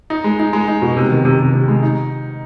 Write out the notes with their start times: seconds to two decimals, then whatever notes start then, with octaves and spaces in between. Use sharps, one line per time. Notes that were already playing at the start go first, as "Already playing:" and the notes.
0.10 D#4
0.24 G#3
0.40 D#4
0.53 G#3
0.68 D#4
0.82 B2
0.96 C3
1.10 D#3
1.25 C3
1.39 C3
1.54 C3
1.68 G#3
1.83 D#4